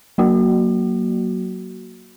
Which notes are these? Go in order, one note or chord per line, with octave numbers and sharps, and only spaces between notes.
F#3 A#3 F#4